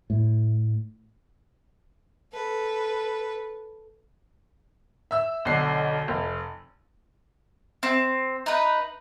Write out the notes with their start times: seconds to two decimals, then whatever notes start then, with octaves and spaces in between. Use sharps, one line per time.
0.10 A2
2.33 A4 B4
5.11 E5 E6
5.45 B1 D3 C7
6.08 F1
7.83 C4
8.46 D#4 B4